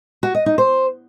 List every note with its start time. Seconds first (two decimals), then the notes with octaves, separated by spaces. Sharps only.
0.23 F#4
0.35 D#5
0.46 D#4
0.58 C5